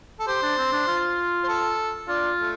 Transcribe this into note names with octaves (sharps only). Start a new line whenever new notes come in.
A4
G4 C5
D4
C4
D4
F4
C5
A4
D4 F4
A3